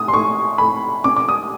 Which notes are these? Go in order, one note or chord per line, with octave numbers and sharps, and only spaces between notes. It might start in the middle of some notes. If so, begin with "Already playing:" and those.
Already playing: A2 D#6
C6
A2 C#6
A2 B5
C#4 D6
D6
D#6